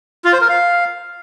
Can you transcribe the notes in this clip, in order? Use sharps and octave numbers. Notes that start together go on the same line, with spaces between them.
F4
C5
A#4
F5